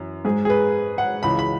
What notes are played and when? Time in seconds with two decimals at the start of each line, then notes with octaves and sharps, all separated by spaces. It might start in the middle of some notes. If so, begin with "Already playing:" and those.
Already playing: F#2 E3
0.25 G#2 G#3 G#4
0.45 G#4
0.50 B4
0.98 F#5
1.23 C#2 C#3 E3 B5
1.39 B5